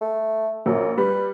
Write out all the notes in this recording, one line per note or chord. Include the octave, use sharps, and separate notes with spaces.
A3
A#1 F#2 F#3
G3 B4